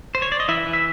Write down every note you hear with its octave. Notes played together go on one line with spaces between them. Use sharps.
C5
C#5
D5
D#5
E3 E4 E5
E3
E5